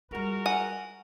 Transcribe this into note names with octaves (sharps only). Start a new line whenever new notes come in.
G3 G#3 F4 F#4 A#4
F#5 G#5